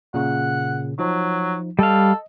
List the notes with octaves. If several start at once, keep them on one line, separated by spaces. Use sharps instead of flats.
A#2 C#3 F#5
F3 F#3 D#4
G3 A4 D#5 F5